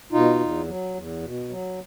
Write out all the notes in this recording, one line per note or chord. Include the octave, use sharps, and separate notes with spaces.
B2 D#4 F4
E2
F#3
E2
B2
F#3